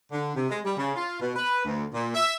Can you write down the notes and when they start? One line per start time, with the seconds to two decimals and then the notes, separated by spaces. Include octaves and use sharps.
0.11 D3
0.35 C3
0.50 G#3
0.64 G3
0.77 C#3
0.96 F4
1.20 B2
1.36 B4
1.65 D2
1.94 A#2
2.15 E5